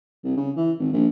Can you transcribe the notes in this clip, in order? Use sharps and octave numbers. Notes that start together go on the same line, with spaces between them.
C2
C#3
E3
G#1
A#1